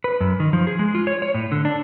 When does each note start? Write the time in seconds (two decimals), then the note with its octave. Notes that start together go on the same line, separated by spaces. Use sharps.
0.04 B4
0.21 F#2
0.40 D#3
0.53 F3
0.67 G#4
0.79 G#3
0.95 F4
1.07 C#5
1.22 C#5
1.34 A2
1.52 D3
1.65 D4